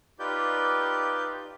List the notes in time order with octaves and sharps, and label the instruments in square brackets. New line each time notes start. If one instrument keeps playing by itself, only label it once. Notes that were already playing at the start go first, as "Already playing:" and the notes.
[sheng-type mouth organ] D#4 F4 G4 B4 D5 G6